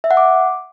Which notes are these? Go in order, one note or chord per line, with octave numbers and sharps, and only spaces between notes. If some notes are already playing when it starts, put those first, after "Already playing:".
E5
F#5
D6